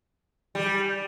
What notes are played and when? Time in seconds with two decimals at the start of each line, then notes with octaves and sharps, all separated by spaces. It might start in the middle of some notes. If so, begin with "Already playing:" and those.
0.55 G3